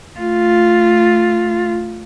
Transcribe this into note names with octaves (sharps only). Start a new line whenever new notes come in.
A3 F4